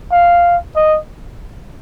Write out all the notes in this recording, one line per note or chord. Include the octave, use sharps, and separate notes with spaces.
F5
D#5